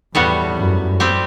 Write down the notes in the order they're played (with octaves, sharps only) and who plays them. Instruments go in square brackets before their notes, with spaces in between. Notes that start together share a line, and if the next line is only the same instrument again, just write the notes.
[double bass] E2 [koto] A2 G3 B3 F#4
[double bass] F#2
[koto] G3 C4 G4